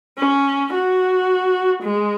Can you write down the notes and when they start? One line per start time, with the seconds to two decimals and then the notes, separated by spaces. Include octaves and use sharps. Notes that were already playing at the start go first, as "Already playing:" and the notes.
0.18 C#4
0.73 F#4
1.82 G#3